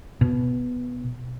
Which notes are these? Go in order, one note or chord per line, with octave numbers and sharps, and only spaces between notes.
B2